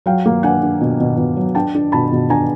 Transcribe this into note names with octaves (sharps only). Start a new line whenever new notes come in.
F#3 F5 G5
A#3
D4 F#5 G#5
D4
B2
B2
B2
F#3
D4 G5 A5
D4
B2 A5 B5
B2
D4 G#5 A#5